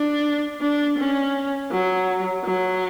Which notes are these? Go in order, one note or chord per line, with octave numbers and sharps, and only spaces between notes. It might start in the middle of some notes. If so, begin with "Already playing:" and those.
Already playing: D4
D4
C#4
F#3
F#3